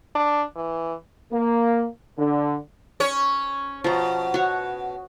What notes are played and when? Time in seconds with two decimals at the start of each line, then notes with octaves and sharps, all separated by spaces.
0.15 D4
0.56 E3
1.32 A#3
2.18 D3
3.00 C#4 C#5
3.84 B2 F3 A#5
4.34 F#4 C#5